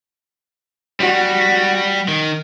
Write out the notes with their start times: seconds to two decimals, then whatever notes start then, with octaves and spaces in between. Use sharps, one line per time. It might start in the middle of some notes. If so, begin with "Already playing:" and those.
1.00 G3 F#4
2.08 D#3